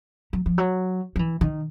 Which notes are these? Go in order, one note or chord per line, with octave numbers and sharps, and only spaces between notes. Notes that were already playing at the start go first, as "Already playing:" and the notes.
F#3
F3
F#3
F3
E3
D#3